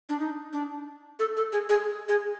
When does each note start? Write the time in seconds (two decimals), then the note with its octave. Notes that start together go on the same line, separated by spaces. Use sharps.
0.09 D4
0.20 D#4
0.53 D4
1.19 A4
1.37 A4
1.53 G#4
1.69 G#4
2.09 G#4